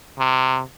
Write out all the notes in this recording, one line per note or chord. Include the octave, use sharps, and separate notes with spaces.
C3